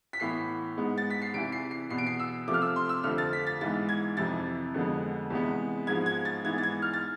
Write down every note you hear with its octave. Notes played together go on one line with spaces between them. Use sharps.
B6
A2 E3 B3 C7
G#2 G#3 B3
A6
B6
C7
E2 C3 E3 D7
C7
C7
E2 B2 B3 C7
D7
C7
E6
C3 F3 A3 D6
F6
E6
C6
E6
F2 D3 F3 A3 F6
A6
B6
A6
G#2 E3 G#3 B3 A6
G#6
F2 C3 E3 A6
F2 D3 G#3 B3
E2 C3 G#3 B3
G#2 F3 G#3 B3 G#6
G#6
A6
G#2 E3 G#3 B3 G#6
A6
G#6
F6
A6